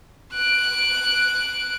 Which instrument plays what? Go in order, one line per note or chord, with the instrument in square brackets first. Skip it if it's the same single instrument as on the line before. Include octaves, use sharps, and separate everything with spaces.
[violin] F#6 D7